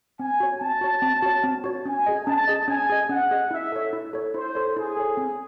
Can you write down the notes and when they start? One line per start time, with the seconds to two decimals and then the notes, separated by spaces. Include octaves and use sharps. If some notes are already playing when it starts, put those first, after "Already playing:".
0.19 C4 G#5
0.40 F#4 C#5
0.60 C4 A5
0.81 F#4 C#5
1.02 C4
1.22 F#4 C#5
1.44 C4
1.64 F#4 C#5
1.85 C#4 G#5
2.06 G#4 D#5
2.26 C#4 A5
2.48 G#4 D#5
2.68 C#4 G#5
2.90 G#4 D#5
3.09 C#4 F#5
3.31 G#4 D#5
3.51 E4 E5
3.72 A4 C#5
3.93 E4
4.13 A4 C#5
4.34 E4 C5
4.55 A4 C#5
4.76 E4 G#4
4.97 A4 C#5
5.17 C4